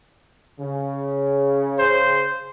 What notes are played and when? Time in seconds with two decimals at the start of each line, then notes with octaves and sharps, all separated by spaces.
0.60 C#3
1.79 C5